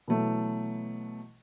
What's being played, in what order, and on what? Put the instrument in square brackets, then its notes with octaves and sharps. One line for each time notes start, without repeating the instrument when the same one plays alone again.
[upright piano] B2 E3 F#3 A3